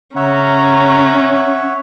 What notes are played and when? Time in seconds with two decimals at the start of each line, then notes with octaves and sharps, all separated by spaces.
0.16 C#3 C#4 C#5 E5 F#5 A#5